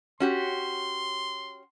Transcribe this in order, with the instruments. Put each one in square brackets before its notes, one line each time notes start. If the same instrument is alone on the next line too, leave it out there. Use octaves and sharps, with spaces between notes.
[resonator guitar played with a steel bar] C#4 F#4 G4 [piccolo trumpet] C6